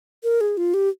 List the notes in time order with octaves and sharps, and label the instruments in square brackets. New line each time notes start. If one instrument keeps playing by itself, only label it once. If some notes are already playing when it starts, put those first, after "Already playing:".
[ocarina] A#4
G#4
F4
G4